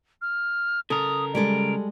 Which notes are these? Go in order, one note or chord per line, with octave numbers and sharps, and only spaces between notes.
F6
C#3 A4 A#4 D#6
G3 G#3 A4 D7